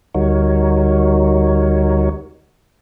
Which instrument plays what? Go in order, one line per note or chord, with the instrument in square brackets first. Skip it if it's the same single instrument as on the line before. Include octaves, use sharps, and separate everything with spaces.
[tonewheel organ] D2 G3 D#4 F#4 A#4 C#5